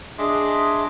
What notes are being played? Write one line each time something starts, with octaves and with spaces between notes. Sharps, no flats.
D4 G#4 D#5 E5 C6 D6